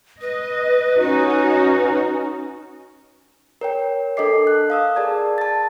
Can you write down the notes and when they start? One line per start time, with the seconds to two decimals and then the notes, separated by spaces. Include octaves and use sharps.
0.21 B4 D#5
0.99 C#4 D#4 F#4
3.61 A#4 C#5 G5
4.17 D4 A4 A#4 D#5 D6 C7
4.45 A5 F#6
4.70 F5 D#6 E6
4.96 G#4 A#4 D5 A5 G#6
5.38 A5 A6